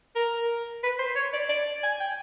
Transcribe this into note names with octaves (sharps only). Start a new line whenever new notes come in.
A#4
B4
C5
C#5
D5
D5
G#5
G5